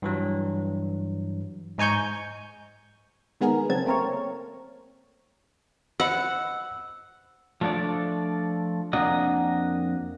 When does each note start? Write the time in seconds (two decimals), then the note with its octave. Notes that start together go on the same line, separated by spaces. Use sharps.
0.02 G2 E3 F#3
1.78 G#2 D#4 G#5 C#6 G6
3.41 D#3 G#3 B3 G#4 A#4
3.69 C#3 F#3 C4 A5 G#6
3.86 A3 A#3 C4 A#4 C#5
6.00 C5 D#5 F#5 B5 E6
7.61 F3 A3 D4 A4 D5
8.93 F2 A#3 D4 F#4 D#5